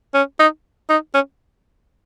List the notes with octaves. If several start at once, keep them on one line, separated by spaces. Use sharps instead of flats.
C#4
D#4
D#4
C#4